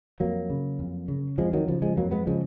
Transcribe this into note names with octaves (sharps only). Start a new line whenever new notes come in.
F2 F#3 A#3
C#3
F2
C#3
F2 F3 G#3
D#3 F#3
C#3 F3
F3 G#3
F2 F#3 A#3
G#3 B3
C#3 F3 G#3